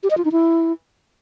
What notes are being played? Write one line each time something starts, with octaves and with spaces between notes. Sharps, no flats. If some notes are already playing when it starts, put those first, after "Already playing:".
G4
D#5
F4
D#4
E4